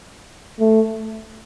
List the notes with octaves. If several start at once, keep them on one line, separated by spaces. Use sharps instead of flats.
A3